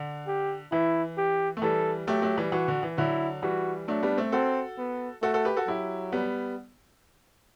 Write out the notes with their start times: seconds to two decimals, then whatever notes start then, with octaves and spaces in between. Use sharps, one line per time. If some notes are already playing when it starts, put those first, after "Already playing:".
Already playing: D3
0.27 G4
0.72 E3 E4
1.18 G4
1.57 A3
1.62 E3 G3 A4
2.07 F#3 A3 G4
2.22 F#3 A3
2.38 E3 G3
2.52 E3 F#4
2.68 D3
2.83 E3
2.98 D3 F#3 E4
3.42 E3 G3 F#4
3.88 F#3 A3 D4
4.03 G3 B3
4.18 A3 C4
4.32 C4 F#4 A4
4.78 B3
5.22 A3 F#4 A4
5.34 F#4 A4
5.45 G4 B4
5.57 F#4 A4
5.68 F#3 E4 G4
6.12 G3 B3